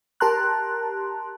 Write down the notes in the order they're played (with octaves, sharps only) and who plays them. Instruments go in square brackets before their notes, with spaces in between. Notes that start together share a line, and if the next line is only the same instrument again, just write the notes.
[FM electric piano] G4 A#4 A5 A#5 C6 F#6